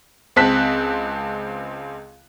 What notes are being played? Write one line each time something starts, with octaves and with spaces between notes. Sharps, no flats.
C#2 C4 A5 F#6 B6